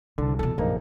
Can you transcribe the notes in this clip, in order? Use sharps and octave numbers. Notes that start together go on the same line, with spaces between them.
C2 D3 A5
E2 B2 A4 A5
A#1 F#2 B2 A#3 D#4